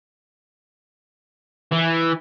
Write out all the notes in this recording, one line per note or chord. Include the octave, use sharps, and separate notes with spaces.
E3